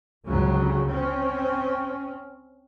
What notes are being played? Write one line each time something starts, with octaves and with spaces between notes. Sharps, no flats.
G1 C#2 G2 C#3 F#3
C4 C#4